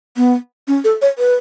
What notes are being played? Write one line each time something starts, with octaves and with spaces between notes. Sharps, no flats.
B3
C#4
A4
C#5
B4